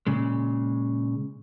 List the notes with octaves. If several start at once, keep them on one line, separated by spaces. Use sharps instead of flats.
A#2 C#3 G#3